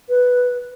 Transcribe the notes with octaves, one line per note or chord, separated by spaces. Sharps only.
B4